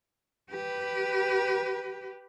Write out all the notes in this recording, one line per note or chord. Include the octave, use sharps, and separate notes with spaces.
G4 B4